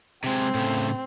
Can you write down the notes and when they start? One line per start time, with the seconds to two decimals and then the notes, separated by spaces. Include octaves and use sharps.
0.24 C3 G#3 C4
0.55 A2 C#3